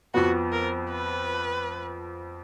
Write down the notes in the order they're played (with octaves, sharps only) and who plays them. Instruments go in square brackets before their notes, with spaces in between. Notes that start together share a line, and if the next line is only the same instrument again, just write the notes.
[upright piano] F2 F3 B3 [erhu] F#4
[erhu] A#4
B4